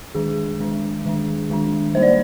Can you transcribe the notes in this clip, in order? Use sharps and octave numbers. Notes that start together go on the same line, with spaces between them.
D#3 G#3 D4 G#4
D#3 G#3 D4
D#3 G#3 D4
D#3 G#3 D4
G3 A#3 D#4 C5
D5